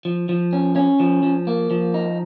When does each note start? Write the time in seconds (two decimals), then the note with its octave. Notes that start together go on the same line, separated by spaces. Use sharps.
0.05 F3
0.29 F3
0.53 C#4
0.76 C#4
1.00 F3
1.23 F3
1.47 A#3
1.71 F3
1.94 D#4